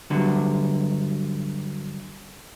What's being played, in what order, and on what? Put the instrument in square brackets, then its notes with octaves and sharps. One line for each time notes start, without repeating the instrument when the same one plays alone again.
[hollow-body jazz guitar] G2 D3 F#3